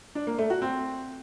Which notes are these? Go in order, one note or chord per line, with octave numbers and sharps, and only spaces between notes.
D4
A#3
A3
F#4
C4